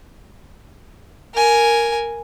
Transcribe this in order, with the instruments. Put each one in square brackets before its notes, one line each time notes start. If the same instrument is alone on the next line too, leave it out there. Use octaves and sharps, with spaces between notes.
[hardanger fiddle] A#4 G#5